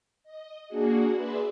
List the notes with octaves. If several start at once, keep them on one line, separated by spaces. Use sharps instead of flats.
D#5
A#3 D4 F#4 G#4 F#5
G#4 B4 D5 E5 C6